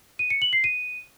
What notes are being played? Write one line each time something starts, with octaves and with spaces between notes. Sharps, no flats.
D#7
C#7
F#7
C7
D#7